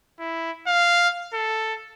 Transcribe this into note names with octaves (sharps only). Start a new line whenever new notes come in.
E4
F5
A4